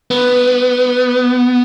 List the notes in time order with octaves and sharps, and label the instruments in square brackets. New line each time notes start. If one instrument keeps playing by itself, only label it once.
[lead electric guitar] B3